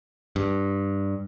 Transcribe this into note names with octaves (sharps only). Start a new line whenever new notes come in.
G2